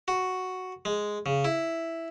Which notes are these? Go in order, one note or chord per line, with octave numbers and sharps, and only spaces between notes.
F#4
G#3
C#3
E4